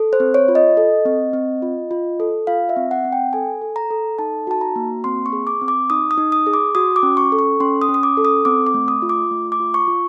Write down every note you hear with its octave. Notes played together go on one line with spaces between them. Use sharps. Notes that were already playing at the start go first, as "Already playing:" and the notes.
Already playing: A4
C5
C4
C#5
F4
D#5
A4
C4
C4
F4
F4
A4
F4 F5
E5
C4
F#5
C4
G5
A4 G#5
A4
A#5
A4
D#4 A5
F#4 A5
A#5
A#3
C4 C6
C#6
G#4
D6
C4
D6
D#4 D#6
D#6
D#4
D#6
G#4
D6
F#4 D#6
D6
C#4
C#6
A4
C#6
C#4 C6
D#6
C#4
D#6
D6
A4
D#6
C4 D6
D6
A3
D#6
F4
D6
A3
D6
F4
C#6
F4